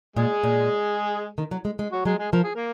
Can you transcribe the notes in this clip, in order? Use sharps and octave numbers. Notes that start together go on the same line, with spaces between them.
A#2 G#3 G#4
A#2
D#3
F#3
G#3
G#3
F#3 F#4
F#3 G#3 G#4
G#3 G#4
F3 A#4
G#4
A#3 A#4